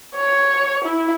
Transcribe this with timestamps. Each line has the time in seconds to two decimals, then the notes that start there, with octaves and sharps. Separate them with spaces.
0.15 C#5
0.84 E4